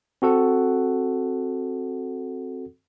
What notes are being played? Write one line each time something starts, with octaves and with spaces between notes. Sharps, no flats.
C4 F#4 A4 F#5